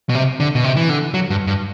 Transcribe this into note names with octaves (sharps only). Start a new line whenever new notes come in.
B2
C3
D3
B2
C3
E3
D3
F#3
G2
G2